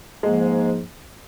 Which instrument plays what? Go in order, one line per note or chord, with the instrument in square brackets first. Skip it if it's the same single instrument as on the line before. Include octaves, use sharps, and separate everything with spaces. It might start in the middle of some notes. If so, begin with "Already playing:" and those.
[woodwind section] G#2 F3 A#3 [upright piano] G#3